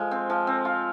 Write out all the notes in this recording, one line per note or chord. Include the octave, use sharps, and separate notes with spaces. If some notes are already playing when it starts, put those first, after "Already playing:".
Already playing: F3 G#3
C4
F3
C4
F4